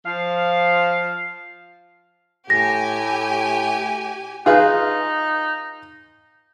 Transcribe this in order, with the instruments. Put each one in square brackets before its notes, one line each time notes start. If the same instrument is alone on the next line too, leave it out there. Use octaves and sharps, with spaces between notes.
[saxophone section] F3 F5
[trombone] A2 [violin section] G4 G#5 [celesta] A#6
[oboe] D#4 [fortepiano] F4 G#4 B4